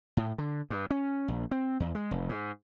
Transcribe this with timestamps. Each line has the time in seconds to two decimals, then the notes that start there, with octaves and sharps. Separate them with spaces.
0.17 A2
0.38 D3
0.70 G2
0.91 C#4
1.28 A#1
1.51 C4
1.80 E2
1.95 G#3
2.11 F1
2.29 G#2